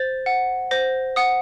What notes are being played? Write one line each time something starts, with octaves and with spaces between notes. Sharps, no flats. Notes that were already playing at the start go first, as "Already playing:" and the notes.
Already playing: C5 A6
F#5
C5 A#6
F#5 D#6